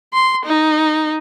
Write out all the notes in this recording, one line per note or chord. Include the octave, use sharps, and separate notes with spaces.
C6
D#4